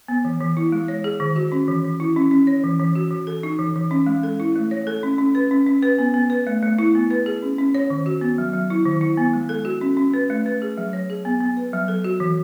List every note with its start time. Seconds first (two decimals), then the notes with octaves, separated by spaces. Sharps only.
0.08 B3
0.25 E3
0.40 E3
0.57 E4
0.72 G#3
0.88 C#5
1.04 G#4
1.20 D#3
1.36 F#4
1.52 C#4
1.68 E3
1.84 E3
2.00 E4
2.16 C#4
2.31 C#4
2.47 C#5
2.64 E3
2.80 E3
2.95 F#4
3.11 E3
3.27 A4
3.43 D#4
3.59 E3
3.76 E3
3.91 C#4
4.07 G#3
4.23 A4
4.40 E4
4.56 A3
4.71 C#5
4.87 A4
5.03 C#4
5.18 C#4
5.35 B4
5.51 C#4
5.67 C#4
5.82 B4
5.98 B3
6.14 B3
6.30 B4
6.47 A3
6.62 A3
6.79 E4
6.95 B3
7.11 B4
7.26 G#4
7.42 C#4
7.58 C#4
7.75 C#5
7.90 D#3
8.06 F#4
8.21 B3
8.38 F#3
8.53 F#3
8.70 E4
8.85 D#3
9.01 E4
9.17 B3
9.33 G#3
9.49 A4
9.65 F#4
9.81 C#4
9.97 C#4
10.14 B4
10.30 A3
10.46 B4
10.62 G#4
10.78 F#3
10.93 C#5
11.10 G#4
11.25 B3
11.41 B3
11.57 B4
11.73 F#3
11.88 A4
12.04 F#4
12.20 E3